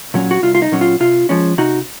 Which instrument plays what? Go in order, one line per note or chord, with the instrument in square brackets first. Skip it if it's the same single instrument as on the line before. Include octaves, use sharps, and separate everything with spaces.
[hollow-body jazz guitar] A#2 F#3 C#4
F#4
C2 F4
F4
D#4
A#2 F#3 C#4
F4
C3 F4
F3 G#3 C#4
C3 D#4 F#4